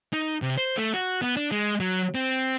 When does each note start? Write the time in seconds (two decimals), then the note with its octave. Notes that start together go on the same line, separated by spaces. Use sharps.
0.13 D#4
0.42 C3
0.57 C5
0.77 A3
0.94 F#4
1.22 B3
1.37 D4
1.52 G#3
1.80 F#3
2.15 C4